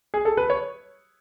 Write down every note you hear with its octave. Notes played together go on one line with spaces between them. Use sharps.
G#4
A4
B4
C#5